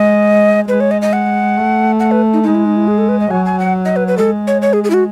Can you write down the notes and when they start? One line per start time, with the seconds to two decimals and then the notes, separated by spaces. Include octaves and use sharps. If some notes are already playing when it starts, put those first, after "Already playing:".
Already playing: G#3 D#5
0.69 G#3 B4
0.80 C#5
0.91 D#5
1.02 D#5
1.13 F#5
1.57 A3
2.00 F#5
2.11 B4
2.33 D#4
2.43 G#3 D#4
2.55 E4
2.66 D#4
2.76 E4
2.88 G#4
2.98 A4
3.09 B4
3.20 D#5
3.31 F#3 G#5
3.45 G#5
3.60 F#5
3.85 D#5
3.96 B4
4.08 B4
4.18 G#3 A4
4.47 C#5
4.62 C#5
4.73 G#4
4.84 G#4
4.90 E4
4.94 F#4